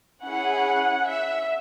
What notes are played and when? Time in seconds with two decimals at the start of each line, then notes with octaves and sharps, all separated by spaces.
0.23 C#4 E4 G#4 F#5
1.06 E5